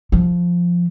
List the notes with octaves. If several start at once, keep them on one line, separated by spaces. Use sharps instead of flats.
F3